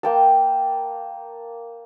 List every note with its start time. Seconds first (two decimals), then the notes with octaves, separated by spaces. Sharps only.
0.03 A#3 G5 A5